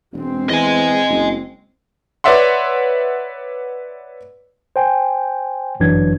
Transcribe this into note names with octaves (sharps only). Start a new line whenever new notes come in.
E1 G#3 C4
E2 D#5 G#5
F#1
B4 C#5 D5 E5 F#5 C6
C5 G5 G#5
G1 F#2 E3 F#3 D4 G#6